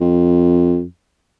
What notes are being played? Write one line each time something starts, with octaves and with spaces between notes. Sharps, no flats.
F2